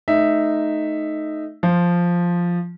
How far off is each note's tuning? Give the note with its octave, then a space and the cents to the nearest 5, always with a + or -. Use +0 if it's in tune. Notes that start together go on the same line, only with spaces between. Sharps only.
A3 -25 D#4 -5 E5 +0
F3 +0 F4 +0